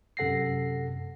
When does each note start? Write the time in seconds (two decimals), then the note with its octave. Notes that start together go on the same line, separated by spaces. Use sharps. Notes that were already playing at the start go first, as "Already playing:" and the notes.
0.17 F#2 C3 A4 F#5 A#6 C7